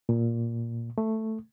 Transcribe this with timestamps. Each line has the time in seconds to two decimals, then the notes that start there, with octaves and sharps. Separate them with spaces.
0.09 A#2
0.98 A3